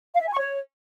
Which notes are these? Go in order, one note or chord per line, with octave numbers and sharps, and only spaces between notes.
F5
E5
G#5
C#6
C#5